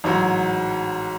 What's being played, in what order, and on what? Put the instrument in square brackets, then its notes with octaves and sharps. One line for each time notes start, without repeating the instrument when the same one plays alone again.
[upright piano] A1 G#2 F#3